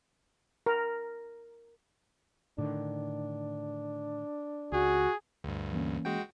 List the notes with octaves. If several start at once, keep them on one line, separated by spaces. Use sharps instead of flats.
A#4
A2 D3 D#3 D4
C#2 F#4 G#4
D2 G2
E3 A#3 C#4
G#3 F#4 G5